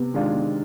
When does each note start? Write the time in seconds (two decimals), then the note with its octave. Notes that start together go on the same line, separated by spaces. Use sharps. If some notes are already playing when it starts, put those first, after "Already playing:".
Already playing: C3 B3
0.14 D#3 G#3 D4 F4